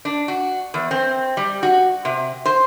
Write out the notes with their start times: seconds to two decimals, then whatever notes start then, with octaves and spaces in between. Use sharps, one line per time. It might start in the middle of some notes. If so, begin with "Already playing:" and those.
0.05 D4
0.28 F#4
0.74 E2
0.91 C4
1.37 G3
1.63 F#4
2.05 C3
2.45 C5